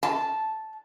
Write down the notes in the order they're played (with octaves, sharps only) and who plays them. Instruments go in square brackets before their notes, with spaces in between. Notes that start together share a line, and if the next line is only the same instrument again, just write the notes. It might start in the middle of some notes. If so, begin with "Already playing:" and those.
[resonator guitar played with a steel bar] A5